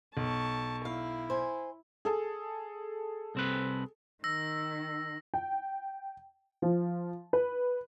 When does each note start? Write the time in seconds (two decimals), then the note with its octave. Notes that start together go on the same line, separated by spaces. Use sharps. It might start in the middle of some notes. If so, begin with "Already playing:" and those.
0.17 B1 A5 C#6
0.85 E4 F5
1.30 C5 G#5
2.05 G#4 A4
3.35 C2 C4 B4
4.24 D#3 E6 A#6
5.34 G5
6.62 F3
7.33 B4